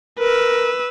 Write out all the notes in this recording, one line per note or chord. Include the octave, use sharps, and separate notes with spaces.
A#4 B4 E6